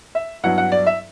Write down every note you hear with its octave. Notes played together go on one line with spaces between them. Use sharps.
E5
G2 F#3 B3 E4 F#5
F#5
D5
E5